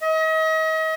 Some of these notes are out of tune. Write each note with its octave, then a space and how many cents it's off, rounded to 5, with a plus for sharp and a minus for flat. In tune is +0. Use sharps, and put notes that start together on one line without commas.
D#5 +40